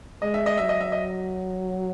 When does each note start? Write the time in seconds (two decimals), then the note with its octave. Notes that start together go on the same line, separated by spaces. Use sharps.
0.22 G#3 D#5
0.34 E5
0.46 D#5
0.57 F#3 E5
0.69 D#5
0.81 E5
0.92 D#5